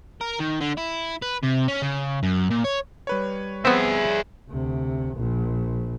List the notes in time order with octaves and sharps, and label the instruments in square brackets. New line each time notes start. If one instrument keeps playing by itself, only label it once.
[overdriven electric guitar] A#4
D#3
D3
E4
B4
C3
C#4
C#3
F#2
A#2
C#5
[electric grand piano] G3 B4 C#5
[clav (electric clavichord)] B3 C4 [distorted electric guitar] G#4 E5
[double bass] D2 C3
A#1 A#2